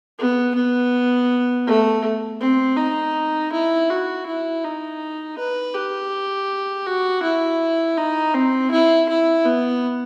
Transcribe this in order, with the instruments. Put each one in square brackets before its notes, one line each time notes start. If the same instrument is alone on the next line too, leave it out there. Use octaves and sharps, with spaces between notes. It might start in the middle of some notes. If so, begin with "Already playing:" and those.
[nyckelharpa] B3
B3
A3
C4
D#4
E4
F#4
E4
D#4
B4
G4
F#4
E4
D#4
C4
E4
E4
B3